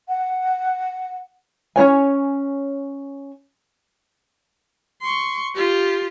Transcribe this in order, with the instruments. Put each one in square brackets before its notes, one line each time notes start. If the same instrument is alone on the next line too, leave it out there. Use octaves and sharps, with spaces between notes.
[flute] F#5
[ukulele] C#4 D4 C#5 G#5
[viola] C6 C#6
F4 G4